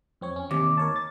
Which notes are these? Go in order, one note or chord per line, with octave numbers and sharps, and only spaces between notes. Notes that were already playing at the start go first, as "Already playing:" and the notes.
F2 C4 C#5
C#4
D#2 C3 D6
A#4 C#5 A5
A6